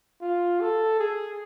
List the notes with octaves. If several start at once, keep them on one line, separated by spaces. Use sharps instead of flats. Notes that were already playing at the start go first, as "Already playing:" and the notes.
F4
A4
G#4